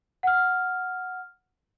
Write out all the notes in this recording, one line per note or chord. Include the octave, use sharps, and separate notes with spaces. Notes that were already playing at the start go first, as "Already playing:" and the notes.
F#5 F6